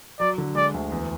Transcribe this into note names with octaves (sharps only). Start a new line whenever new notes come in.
F#3 D5
D3
G#3 D5
D2
E2